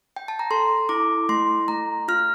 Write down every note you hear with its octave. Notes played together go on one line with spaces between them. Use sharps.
G5
A5
A#5
A4 C6
E4 D6
A3 C6
A3 A#5
F4 F6